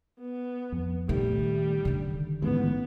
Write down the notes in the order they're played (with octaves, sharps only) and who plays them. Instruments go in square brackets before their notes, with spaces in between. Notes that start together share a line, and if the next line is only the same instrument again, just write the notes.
[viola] B3
[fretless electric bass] F2
[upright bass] A#2 D#3 [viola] G3 [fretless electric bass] A3
[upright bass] D3 D#3
[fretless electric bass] A1 G#2 [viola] B3